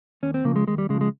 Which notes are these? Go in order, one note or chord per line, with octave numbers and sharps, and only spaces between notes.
D#2 C#4
C4
C#3 F3 A#3
G#3
D#2 G#3
G3
C#3 G#3
F3
G#3